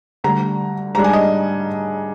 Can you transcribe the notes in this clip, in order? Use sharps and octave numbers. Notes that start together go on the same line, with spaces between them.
D2 D3 G3 A#5
G#2 G3 D4 A#5
G#5
D#5